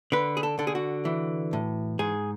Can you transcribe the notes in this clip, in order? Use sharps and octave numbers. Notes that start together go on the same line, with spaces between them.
D3 B4
G#4
A4
D3 A4
G#4
F#4
E3
A2
G#2 G#4